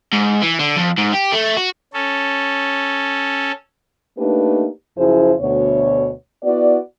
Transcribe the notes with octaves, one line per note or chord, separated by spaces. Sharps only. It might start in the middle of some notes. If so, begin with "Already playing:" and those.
G#2
E3
D3
F2
G#2
G4
A3
F#4
C#4 A4
A3 A#3 D4 D#4 G4 B4
F#2 C#3 F3 E4 G#4 C5
D2 B2 C#5
B3 E4 F#4 D5